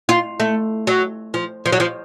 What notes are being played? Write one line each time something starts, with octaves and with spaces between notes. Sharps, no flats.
F4
A3
F#3
F3
F3
F#3
F3